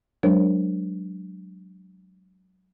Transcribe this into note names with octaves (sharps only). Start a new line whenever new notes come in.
F#3 G#3 D4 A#4 C5 C#5